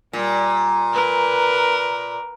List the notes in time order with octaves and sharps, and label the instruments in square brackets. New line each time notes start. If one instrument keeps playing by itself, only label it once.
[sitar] A#2 [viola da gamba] G3
[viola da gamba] A#4 B4